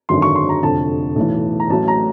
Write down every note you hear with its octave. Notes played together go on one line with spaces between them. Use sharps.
G#1 F#2 D3 F#3 C6
C#6
C6
A#5
F1 F2 D3 A5
B1 A2 E3
A#5
A1 A2 F#3 A5
A#5